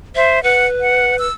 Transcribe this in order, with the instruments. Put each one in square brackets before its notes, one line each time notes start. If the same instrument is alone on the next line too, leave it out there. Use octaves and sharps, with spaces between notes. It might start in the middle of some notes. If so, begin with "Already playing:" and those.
[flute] C5 [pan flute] E5
[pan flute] B4 [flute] F#5
[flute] F#5
E6